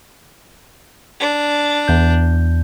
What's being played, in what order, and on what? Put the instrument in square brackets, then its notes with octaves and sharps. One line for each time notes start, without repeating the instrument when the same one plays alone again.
[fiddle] D4
[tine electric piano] E2 G6